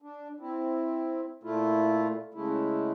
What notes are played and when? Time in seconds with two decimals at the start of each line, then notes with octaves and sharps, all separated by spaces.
0.02 D4
0.40 C4 E4
1.43 A#2 A3 E4 F4
2.34 C#3 G#3 A3 E4